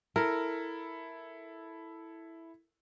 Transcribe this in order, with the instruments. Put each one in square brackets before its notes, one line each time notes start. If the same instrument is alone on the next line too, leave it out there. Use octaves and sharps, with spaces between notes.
[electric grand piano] E4 A4 [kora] A#4